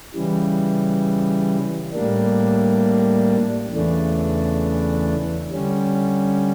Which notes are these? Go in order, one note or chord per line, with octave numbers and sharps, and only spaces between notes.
C#3 E3 G3
A2 G3 A#3 D4
E2 C#3 E3 A3 D4
D3 G3 C#4